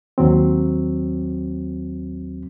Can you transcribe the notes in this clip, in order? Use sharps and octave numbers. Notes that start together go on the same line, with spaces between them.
D#2 F#3 C4